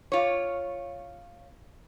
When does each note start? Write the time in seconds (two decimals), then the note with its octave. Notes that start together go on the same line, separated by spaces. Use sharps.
0.12 F4 C#5